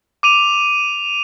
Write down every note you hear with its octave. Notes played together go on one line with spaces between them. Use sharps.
D6 D#7 F7